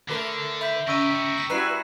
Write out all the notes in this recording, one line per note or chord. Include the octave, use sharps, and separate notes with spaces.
D3 A3 A#4 B4
E5 B5 G6 B6
C#3 G4 A#4 C#6 E6 D#7
C#7
B6 F#7
G3 E4 F#4 B4 A#5 F#6 C7